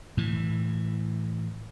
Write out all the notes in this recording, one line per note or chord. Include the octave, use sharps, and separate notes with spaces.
A2 E3